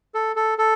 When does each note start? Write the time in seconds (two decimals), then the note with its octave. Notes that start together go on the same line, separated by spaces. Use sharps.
0.14 A4
0.36 A4
0.58 A4